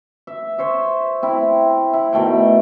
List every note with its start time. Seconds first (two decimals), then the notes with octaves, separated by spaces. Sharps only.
0.27 E5
0.58 C5 C#5 E5
1.23 C4 E4
1.93 E4
2.13 B2 D#3 A3 G5